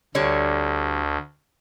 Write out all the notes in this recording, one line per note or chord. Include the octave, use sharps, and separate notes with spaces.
D2 D3 G3 C#5